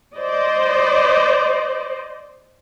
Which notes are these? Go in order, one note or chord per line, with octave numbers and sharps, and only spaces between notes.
C5 D5 D#5